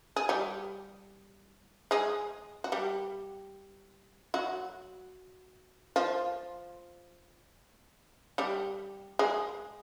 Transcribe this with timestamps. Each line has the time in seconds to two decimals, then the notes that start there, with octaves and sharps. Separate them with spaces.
0.16 G#4
0.29 G3 G4
1.91 G#3 G#4
2.64 F#4
2.72 G3 G4
4.34 F#3 F#4
5.96 F3 F4
8.38 G3 G4
9.19 G#3 G#4